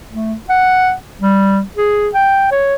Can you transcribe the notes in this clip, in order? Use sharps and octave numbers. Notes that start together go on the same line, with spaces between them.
A3
F#5
G3
G#4
G5
C#5